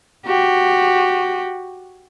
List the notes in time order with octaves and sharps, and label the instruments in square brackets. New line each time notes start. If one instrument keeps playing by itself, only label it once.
[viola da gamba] F#4 G4